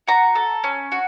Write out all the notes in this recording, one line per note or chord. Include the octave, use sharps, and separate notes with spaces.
F#4 A#5
A4
C#4
F#4